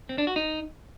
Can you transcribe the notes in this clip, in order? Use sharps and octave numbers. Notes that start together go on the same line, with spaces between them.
C4
D4
F#4
D#4